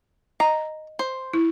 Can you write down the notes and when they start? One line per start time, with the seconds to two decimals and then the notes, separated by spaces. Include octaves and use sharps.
0.40 D#5 A#5
0.99 C5
1.33 E4